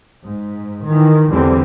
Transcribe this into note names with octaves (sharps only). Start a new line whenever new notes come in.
G#2
D#3 E3
E2 D3 E3 G3 C4